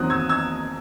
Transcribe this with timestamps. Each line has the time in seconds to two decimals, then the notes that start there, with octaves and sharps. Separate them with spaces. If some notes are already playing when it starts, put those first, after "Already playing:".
Already playing: E2 D#3 F#3 C4 D#6 F#6
0.10 E6 G#6
0.29 E6 G#6